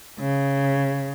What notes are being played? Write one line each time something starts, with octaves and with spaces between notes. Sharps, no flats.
C#3